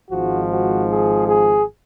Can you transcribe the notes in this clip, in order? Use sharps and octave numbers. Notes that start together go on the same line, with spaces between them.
G#1 G#2 F3 F#4
F#4
G#4
G#4